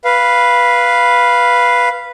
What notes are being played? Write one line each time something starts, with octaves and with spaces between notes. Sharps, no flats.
B4 F5